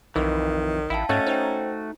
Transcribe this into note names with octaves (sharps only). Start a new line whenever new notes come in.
B1 F2 D#3 E3
A1 E4 F5 G5 A5
G#2 A3 C#4 F#4 D#5 A6
D#4 C5 G5